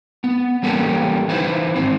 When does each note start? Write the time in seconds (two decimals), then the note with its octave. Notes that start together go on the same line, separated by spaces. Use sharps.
0.24 B3
0.63 E3 G3 A#3 C#4 G4 A4
1.28 E3 D#4 E4 B4 C5
1.75 G#2 D#3 C4